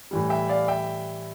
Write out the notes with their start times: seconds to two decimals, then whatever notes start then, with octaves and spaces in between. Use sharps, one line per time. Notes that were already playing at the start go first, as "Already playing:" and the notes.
0.11 A2 E3 G3
0.30 E5 G5
0.49 D5 F5
0.68 E5 G5